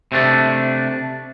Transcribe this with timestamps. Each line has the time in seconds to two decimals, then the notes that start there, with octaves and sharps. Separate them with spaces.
0.12 C3 A3 D4